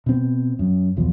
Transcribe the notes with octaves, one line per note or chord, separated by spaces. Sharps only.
B2 C4
F#2
B1 E2 F3